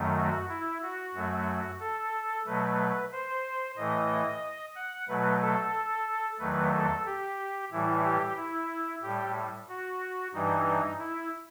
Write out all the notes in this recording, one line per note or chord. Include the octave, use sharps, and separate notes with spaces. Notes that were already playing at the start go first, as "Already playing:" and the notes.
Already playing: F#2 D#3 F#3 A3
F#4
E4
F#4
F#2 F#3 A3
A4
B2 F#3 A3 B4
C5
A2 E3 A3 D#5
F#5
B2 F#3 A3 B4
A4
E2 D#3 F#3 A3 B4
A4
G4
A2 E3 G3 E4
G4
E4
A2 G3 G4
F#4
G2 E3 G3 D#4
E4